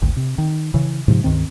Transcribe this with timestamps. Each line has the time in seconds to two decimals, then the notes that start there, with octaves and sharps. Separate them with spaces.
0.02 G#1 D2
0.17 C3
0.38 D#3
0.74 C#3 E3
1.08 G#2 C3 F3
1.24 C#2 G2 D#3 C4